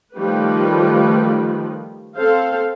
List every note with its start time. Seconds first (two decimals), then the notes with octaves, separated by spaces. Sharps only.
0.17 D#3 F3 G3 A3 G4 B4
2.17 C4 A4 C5 F5